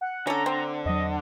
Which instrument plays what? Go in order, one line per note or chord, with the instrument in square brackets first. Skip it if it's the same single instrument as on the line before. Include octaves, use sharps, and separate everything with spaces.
[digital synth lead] F#5
[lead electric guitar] D3 [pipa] C#4 A4 [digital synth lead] A#5
[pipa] C4
[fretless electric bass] E2 F#3 [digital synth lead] D#5